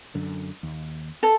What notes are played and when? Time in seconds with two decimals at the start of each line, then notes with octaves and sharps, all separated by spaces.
0.15 F#2 D3
0.63 D#2
1.23 A4